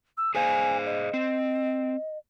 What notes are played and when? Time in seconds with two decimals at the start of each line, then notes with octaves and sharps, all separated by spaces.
0.17 E6
0.35 G#4 C5 F5 G#5
0.86 D#5
1.14 C4